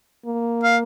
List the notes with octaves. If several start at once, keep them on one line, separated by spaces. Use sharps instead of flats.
A#3
F5